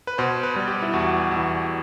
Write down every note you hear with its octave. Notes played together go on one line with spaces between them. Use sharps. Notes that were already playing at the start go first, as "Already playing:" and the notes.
B4
B2 C5
B4
G3
G4
E4
E2 F#4
E2 E4